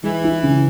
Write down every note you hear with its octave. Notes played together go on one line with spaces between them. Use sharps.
E3 G#3
E4
C#3